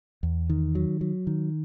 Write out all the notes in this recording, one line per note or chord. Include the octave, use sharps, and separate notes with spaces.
E2
D#3
F#3
F#3
D#3